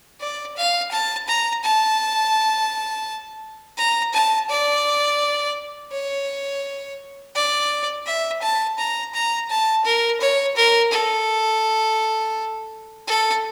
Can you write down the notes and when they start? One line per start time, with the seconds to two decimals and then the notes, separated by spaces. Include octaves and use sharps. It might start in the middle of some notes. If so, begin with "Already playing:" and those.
0.20 D5
0.57 F5
0.91 A5
1.28 A#5
1.64 A5
3.78 A#5
4.13 A5
4.50 D5
5.92 C#5
7.35 D5
8.06 E5
8.42 A5
8.78 A#5
9.14 A#5
9.50 A5
9.85 A#4
10.21 C#5
10.57 A#4
10.92 A4
13.07 A4